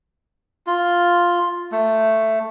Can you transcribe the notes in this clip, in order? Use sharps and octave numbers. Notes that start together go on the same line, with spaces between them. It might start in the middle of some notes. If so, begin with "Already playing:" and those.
F4
A3